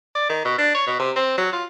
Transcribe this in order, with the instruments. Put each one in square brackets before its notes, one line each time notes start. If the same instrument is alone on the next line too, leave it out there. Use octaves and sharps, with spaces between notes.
[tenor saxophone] D5
D#3
B2
D4
C#5
B2
C3
C4
F#3
F4